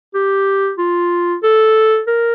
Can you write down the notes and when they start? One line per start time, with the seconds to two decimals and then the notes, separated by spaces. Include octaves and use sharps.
0.14 G4
0.78 F4
1.43 A4
2.07 A#4